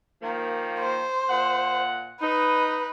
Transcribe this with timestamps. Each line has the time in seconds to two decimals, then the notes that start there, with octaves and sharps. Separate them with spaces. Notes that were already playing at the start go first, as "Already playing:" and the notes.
0.21 D#3 F3 A#3
0.80 C5
1.29 A#2 F#5
2.21 D#4 B4